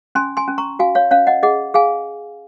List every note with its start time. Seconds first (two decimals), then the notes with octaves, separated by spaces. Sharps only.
0.15 C#4 G#5 C6
0.37 G#5 C6
0.48 C#4
0.58 A#5 C#6
0.79 F#4 F5 G#5
0.95 C#5 F5
1.11 C#4 C#5 F5
1.27 D#5 F#5
1.43 G#4 D#5 F#5
1.74 G#4 F5 G#5